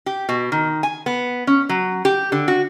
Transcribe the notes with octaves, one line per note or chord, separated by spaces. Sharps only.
G4
B2
D#3
G#5
B3
C#4
F#3
G4
D3
F#4